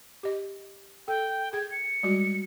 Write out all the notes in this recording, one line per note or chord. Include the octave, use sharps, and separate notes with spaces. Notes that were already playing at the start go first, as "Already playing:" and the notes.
G4 D#5
A4 G5
G#4 G5 G#6
C#7
G3 G#3 F#4